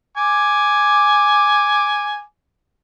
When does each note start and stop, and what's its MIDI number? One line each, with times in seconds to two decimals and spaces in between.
0.17 2.22 80
0.17 2.22 86